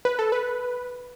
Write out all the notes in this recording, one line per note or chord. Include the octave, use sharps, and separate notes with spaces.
B4
A4
B4